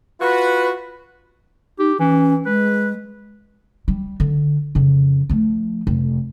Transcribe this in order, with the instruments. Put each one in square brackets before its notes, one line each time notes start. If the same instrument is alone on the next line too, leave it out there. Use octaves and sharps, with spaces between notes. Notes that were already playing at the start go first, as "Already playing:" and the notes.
[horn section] F4 F#4 [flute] B4
[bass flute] D#4 [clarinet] G4
[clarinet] E3 [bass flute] C#4
[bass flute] G#3 [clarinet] B4
[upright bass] G3
D3
F2 C#3
F3 A3
F1